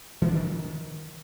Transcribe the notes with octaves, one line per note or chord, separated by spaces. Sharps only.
E3
D4
D#3